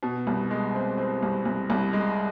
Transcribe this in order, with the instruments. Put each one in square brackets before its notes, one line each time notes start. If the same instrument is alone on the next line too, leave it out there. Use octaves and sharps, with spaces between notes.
[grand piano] B2
C2
G#3
C4
C4
C2
C2
C2
G#3